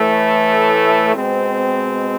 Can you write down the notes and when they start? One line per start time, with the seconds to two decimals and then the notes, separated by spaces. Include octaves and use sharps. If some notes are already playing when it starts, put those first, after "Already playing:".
Already playing: A2 E3 A3
1.15 B2 G#3 C4